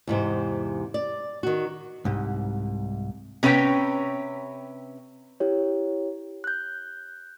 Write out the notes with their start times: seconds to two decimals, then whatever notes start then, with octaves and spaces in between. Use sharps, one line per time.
0.07 E2 G#2 C3 C5
0.94 D5
1.43 D#3 F#4
2.05 C2 G#2
3.43 C3 C#4 B4 C#5 G5
5.40 E4 G4 C#5
6.44 F#6 G6